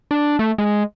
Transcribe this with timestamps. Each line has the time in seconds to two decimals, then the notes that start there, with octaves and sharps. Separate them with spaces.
0.11 D4
0.39 A3
0.58 G#3